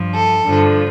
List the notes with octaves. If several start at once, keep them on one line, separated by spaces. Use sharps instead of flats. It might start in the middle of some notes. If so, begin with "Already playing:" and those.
Already playing: G2 F3
A4
G2 D3 F3